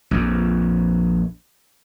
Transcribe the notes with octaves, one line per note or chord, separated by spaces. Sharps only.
A#1 F2